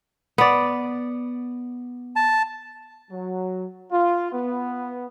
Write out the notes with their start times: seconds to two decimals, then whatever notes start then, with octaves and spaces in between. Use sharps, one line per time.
0.38 B3 D5
2.16 A5
3.10 F#3
3.92 F4
4.33 B3